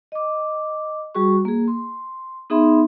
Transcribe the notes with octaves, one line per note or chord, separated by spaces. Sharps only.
D#5 D6
G3 F#4 G#4 C#6
A#3 G#4
C6
B3 D#4 G#4 E5 B5 C6